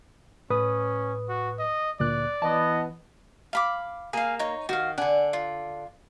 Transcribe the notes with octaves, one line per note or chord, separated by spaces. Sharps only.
A2 C#4 B4 D#6
F#4
D#5
D2 A#2 D5 F#6
E3 B3 D#5 A5
F5 B5 D6
A#3 G#4 F5
D#4 C#5
D#3 F#4 F5
D3 D4 F#5 G#5
F4